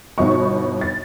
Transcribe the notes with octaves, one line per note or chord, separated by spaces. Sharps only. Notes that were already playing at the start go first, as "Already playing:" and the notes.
G1 B2 B3 D#4 C#6
A6